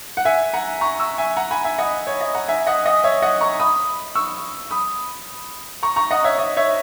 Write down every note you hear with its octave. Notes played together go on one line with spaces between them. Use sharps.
F#5
E5 G#5
F#5 A#5
A#5 C#6
C#6 E6
E5 G#5
F#5 A#5
G#5 B5
E5 G#5
D#5 F#5
C#5
D#5
F#5 A#5
E5 G#5
D#5 F#5
D#5 F#5
C#5 E5
D#5 F#5
A#5 C#6
B5 D#6
C#6 E6
B5 D#6
A#5 C#6
A#5 C#6
D#5 F#5
C#5 E5
D#5
C#5 E5